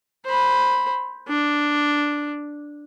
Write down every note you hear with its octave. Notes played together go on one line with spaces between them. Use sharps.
C5 B5
D4